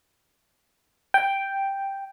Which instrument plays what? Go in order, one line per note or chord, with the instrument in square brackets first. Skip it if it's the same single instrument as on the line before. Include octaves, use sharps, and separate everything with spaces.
[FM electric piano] G5